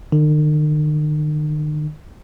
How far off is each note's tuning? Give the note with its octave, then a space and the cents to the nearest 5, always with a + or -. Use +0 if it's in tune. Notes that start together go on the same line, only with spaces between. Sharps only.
D#3 -45